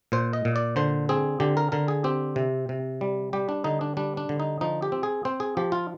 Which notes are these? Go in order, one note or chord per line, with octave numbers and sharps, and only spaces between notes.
A#2 C5
D#5
A#2
D5
D3 C5
C4 G#4
D3 G4
A#4
D3 A#4
G#4
C4 G4
C3
C3
G3
G3 G4
D4
D3 D#4
D4
G3 D4
D4
D3
D#4
F3 D#4
G4
C4
G#4
C4 C5
G#4
F3 G4
F4